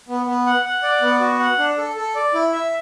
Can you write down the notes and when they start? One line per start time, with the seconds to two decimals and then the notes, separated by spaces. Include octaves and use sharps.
0.09 B3
0.27 B3
0.46 F#5
0.65 F#5
0.83 D5
1.02 B3
1.20 F#4
1.40 F#5
1.58 D4
1.78 A4
1.96 A4
2.15 D5
2.34 E4
2.52 E5